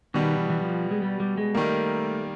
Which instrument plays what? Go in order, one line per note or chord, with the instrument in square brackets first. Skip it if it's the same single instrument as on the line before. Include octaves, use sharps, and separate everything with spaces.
[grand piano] B2 G3 B3 [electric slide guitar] D#3
[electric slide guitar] E3
E3
F3
G#3
G3
G3
G#3
[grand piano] D#3 G3 A#3 [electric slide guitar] A3